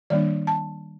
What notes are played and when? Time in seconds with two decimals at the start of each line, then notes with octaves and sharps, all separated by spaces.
0.10 D#3 G3 A#3 D4 D5
0.47 A5